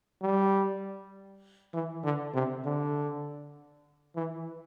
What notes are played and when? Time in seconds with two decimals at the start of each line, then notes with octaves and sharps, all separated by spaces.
0.22 G3
1.73 E3
2.04 D3
2.34 C3
2.64 D3
4.16 E3